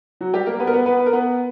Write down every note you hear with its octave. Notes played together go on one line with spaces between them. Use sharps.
F#3 F#4
G3 G4
A#3 A#4
B3 B4
A#4
B3 B4
B3 B4
B4
A#4
B3 B4